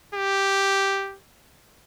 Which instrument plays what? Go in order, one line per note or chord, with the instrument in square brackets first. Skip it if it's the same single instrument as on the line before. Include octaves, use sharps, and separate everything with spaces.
[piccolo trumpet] G4